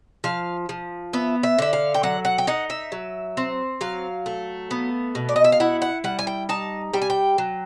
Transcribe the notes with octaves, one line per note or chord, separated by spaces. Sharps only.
F3 F5
F3
B3 E5
E5
D3 E5
F5
G5
F#3 F#5
F#5
G5
D#4 F#5
E5
F#3
C4
F#3 F5
A3
B3
B2
D5
D#5
E5
F5
E4 F#5
F#5
G3 F#5
G#5
G5
D#4 A5
G3 G5
G#5
G5
F#3